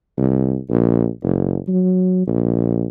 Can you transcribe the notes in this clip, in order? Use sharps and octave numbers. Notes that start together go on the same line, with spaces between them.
C2
A#1
F#1
F#3
A#1